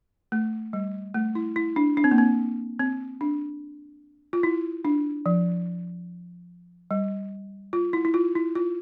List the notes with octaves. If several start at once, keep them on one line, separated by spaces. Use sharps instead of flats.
A3
G3
A3
E4
E4
D4
D4
C4
A#3
C4
C4
D4
F4
E4
D4
F3
G3
F4
E4
E4
F4
E4
F4